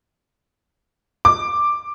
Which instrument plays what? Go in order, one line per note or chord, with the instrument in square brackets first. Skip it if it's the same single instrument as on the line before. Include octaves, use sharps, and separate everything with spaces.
[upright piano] D6